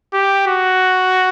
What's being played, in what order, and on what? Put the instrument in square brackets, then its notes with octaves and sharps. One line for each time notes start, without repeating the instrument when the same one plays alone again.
[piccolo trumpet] G4
F#4